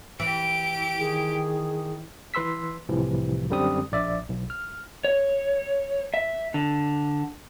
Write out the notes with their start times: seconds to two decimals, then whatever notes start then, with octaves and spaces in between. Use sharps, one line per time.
0.20 E3 G4 D7
0.99 D#3 G#4
2.34 E3 B4 C6 E6 B6
2.89 C2 A2 C3 E3 F3
3.50 F#2 D3 G3 C4 D#6
3.92 A#1 D5 E5
4.29 B1
4.50 F6
5.04 C#5
6.14 E5
6.54 D3